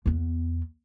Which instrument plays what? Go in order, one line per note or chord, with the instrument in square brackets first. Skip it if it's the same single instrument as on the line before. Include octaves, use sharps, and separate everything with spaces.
[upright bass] E2 B3